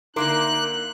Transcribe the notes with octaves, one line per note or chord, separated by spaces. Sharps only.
D3 A#3 D#4 E4 A#4 C6 D6 F#6